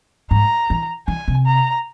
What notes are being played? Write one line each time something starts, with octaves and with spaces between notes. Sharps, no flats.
G#2 A#5
E3
E3 G#5
C3
A#5